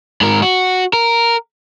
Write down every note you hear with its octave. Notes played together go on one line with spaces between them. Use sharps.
G#2 A#4
F#4
A#4